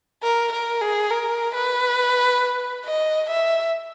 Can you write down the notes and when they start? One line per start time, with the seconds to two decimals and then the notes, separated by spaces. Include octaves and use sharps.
0.23 A#4
0.52 A#4
0.81 G#4
1.10 A#4
1.54 B4
2.85 D#5
3.29 E5